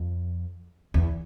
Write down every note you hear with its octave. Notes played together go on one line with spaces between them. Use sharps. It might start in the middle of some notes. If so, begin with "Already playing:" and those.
Already playing: F2
E2